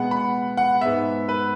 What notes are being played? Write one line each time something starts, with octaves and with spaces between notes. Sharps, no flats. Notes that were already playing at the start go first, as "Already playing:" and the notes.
Already playing: B2 G#3 B3 F#5
B5
F#5
G#2 G#3 B3 E5
B4